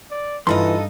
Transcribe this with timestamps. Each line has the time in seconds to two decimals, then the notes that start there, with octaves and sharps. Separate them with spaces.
0.11 D5
0.47 G2 E3 D#4 F4 A4 D#5 B5 C6